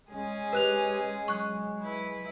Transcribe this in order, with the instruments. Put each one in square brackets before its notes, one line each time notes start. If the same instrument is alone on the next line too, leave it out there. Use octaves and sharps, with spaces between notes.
[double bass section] G#3 [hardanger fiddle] C#4 G#4
[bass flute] G4 [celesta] B4 F#6 F7
[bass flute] F#3 [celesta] C#6 F#6
[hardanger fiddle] E4 B4